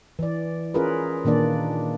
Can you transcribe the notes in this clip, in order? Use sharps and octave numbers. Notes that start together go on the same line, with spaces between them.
E3 D5
C#4 F4 G#4 A#4 B4
A#2 D#3 A#3 D4 D5